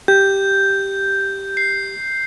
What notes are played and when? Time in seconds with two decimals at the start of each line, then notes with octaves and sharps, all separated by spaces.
0.08 G4 G6
1.57 C7